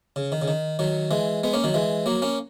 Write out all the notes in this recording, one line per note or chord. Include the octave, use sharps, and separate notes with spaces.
C#3
D#3
C#3
D#3
D#3 F#3
E3 G#3
G#3 B3
A#3 C#4
D#3 F#3
E3 G#3
F#3 A#3
A#3 C#4